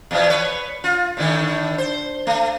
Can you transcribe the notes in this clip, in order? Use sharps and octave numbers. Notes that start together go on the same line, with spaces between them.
E2 B2 F3
B4 C#5
F4
A2 D3 D#3
C5
A3